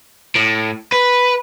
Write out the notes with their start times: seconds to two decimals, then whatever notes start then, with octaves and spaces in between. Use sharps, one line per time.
0.35 A2
0.92 B4